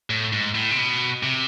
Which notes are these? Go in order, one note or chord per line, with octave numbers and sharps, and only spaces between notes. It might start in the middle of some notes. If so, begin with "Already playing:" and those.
A2
G#2
A2
C3
B2
C3